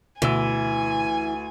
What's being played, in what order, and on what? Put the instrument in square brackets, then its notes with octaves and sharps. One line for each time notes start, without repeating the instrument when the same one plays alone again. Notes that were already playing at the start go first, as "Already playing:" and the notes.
[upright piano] D2 E6 [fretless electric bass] B2 D3 [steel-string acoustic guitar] E3 [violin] G#5